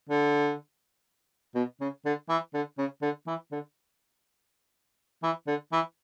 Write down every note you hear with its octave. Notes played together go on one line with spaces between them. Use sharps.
D3
B2
C#3
D3
E3
D3
C#3
D3
E3
D3
E3
D3
E3